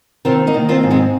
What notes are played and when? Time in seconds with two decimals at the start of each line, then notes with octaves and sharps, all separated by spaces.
0.25 D#3 C4 F4
0.47 A#3 D#4
0.54 D#3
0.69 C4 F4
0.83 G#2
0.91 G#3 C4